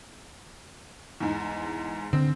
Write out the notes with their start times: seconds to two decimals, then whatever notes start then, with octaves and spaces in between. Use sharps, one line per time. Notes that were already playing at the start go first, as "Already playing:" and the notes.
1.20 E2 G#2
2.13 D3 C4